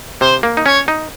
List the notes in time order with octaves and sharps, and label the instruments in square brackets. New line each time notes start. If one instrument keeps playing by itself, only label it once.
[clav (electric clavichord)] C3 [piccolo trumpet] C5
[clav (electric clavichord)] A#3
D#4
[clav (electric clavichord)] C#4 [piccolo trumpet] C#5
[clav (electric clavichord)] D#4